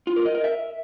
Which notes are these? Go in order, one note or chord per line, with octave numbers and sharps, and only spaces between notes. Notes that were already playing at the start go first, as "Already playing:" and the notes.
F4
A#4
D#5
A#4
E5